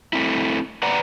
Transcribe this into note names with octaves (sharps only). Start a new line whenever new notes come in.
A3 C4 E4
B4 D5 F#5 A#5